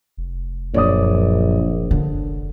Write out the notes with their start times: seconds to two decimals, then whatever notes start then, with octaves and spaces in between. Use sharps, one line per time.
0.17 F1
0.74 A#1 F#2 C#5 D5 D#6
1.91 D3